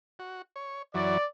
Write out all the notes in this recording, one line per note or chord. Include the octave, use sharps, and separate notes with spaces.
F#4
C#5
F#2 E3 F#3 D5